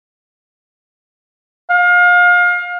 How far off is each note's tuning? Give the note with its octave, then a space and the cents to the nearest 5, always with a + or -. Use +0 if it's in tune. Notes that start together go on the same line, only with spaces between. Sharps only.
F5 +30